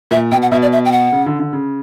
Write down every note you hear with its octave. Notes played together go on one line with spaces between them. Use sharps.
A#2 E5
B2 G5
F#5
B2 E5
D5
E5
G5
F#5
C#3
D3
D3
C#3